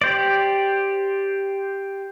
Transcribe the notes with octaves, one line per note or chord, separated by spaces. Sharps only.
G4 C5 D5